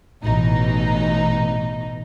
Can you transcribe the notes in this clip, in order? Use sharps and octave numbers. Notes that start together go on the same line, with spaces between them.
A1 B2 E3 D#4